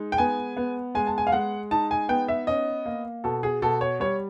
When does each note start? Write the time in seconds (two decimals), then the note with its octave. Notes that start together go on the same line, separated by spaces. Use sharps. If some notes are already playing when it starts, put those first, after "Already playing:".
Already playing: G#3 D#4
0.12 G5
0.18 B3 G#5
0.57 B3
0.95 G#3 G#5
1.07 A5
1.18 G#5
1.27 F5
1.32 G#3 F#5
1.71 D#4 A5
1.91 G#5
2.09 B3 G5
2.28 E5
2.47 C#4 D#5
2.86 A#3
3.24 B2 A4
3.43 G#4
3.62 B2 A4
3.81 C#5
4.00 G3 C#5